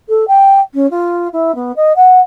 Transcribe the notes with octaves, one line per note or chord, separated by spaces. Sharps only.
A4
G5
C#4
F4
E4
B3
D#5
F#5